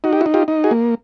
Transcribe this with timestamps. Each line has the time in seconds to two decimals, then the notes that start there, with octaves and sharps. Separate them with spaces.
0.04 D#4 F#4
0.13 G4
0.21 E4 F#4
0.26 D#4
0.34 F4 G4
0.48 D#4
0.64 F#4 G#4
0.71 A#3